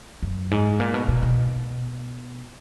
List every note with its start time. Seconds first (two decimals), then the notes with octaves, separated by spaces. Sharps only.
0.23 F#2
0.51 G#2
0.80 A#2
0.94 B2
1.08 B2
1.23 B2